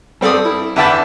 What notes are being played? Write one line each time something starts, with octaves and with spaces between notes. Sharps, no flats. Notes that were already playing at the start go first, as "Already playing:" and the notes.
G2 C4 A4 D5 D#6
E4
E2 D3 E5 G5 A5 B5